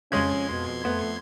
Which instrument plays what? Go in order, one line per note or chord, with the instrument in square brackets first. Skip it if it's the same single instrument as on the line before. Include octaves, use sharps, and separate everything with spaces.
[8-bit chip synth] F2 C6 G#6 [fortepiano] C#3 G#3 [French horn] C#4
[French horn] B2
[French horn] A3 [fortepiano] B3